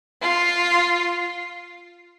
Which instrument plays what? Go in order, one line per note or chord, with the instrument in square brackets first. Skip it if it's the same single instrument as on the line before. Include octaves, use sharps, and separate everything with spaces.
[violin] F4